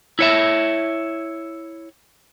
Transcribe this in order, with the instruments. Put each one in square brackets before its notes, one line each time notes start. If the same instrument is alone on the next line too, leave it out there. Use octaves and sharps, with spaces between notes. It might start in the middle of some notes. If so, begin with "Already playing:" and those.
[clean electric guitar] E4 C#5 E5